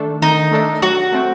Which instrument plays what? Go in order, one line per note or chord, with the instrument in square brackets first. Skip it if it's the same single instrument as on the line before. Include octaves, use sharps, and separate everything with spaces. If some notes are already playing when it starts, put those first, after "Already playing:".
Already playing: [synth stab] D#3 A3 D4 A4
[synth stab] D#3 [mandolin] D#4
[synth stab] A3 D4 A4
[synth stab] F#3 [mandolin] F#4
[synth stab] A3 C4